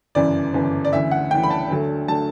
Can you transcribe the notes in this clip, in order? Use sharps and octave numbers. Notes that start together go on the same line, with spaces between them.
G1 F#2 C#3 E3 D5
G1 F#2 C#3 E3
D5
D2 C#3 E3 E5
F#5
D2 C#3 E3 G5
B5
A5
D2 D3 F#3 A3
D3 F#3 A3 A5